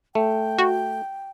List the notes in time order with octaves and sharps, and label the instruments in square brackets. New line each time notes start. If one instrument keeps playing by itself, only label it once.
[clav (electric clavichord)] A3 [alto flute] G5
[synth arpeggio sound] F#4